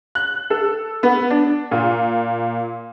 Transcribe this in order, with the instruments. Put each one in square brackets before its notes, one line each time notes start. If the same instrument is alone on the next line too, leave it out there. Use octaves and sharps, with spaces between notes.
[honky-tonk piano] F#6
A4
B3
D4
A#2